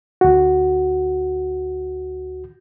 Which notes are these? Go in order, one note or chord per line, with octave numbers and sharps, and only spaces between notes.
D2 F#4